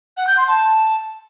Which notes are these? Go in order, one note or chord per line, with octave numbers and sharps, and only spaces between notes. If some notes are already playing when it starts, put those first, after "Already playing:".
F#5
G6
C6
A5